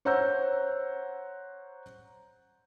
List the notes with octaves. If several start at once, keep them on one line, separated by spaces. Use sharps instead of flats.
C5 C#5 F#5 A#5 E6 G6